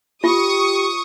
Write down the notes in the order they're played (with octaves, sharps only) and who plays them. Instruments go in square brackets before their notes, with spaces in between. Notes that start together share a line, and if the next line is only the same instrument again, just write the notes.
[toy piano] F4 [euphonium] G4 [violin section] C#6 D#6